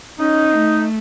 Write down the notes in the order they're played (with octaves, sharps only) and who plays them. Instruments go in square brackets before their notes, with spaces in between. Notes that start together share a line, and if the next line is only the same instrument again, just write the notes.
[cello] C#4 [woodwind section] D#4
[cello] A3